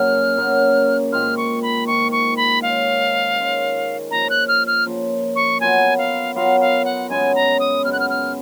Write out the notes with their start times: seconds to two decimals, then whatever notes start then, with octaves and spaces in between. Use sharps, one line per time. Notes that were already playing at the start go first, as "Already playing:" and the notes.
Already playing: F#2 C#3 F#3 A#3 F6
0.37 F#2 C#3 F#3 A#3
1.12 G#2 D#3 A#3 F4 F6
1.37 C#6
1.62 B5
1.87 G#2 D#3 A#3 F4 C#6
2.12 C#6
2.37 B5
2.62 D#3 G#3 C#4 F5
3.36 D#3 G#3 C#4
4.11 C#3 F3 A#3 A#5
4.30 F#6
4.48 F6
4.67 F6
4.86 C#3 F3 A#3
5.36 C#6
5.61 F#3 B3 F4 A#4 G#5
5.98 F5
6.35 F#3 B3 F4 A#4 F5
6.61 F5
6.85 F#5
7.09 F#2 C#3 G#3 B3 G#5
7.35 A#5
7.60 D#6
7.84 F#2 C#3 G#3 B3 F6
7.93 F#6
8.00 F6
8.10 F6